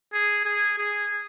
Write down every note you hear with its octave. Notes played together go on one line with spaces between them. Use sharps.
G#4
G#4
G#4